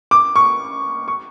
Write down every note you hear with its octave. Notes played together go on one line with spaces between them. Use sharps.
D6
C#6
C#6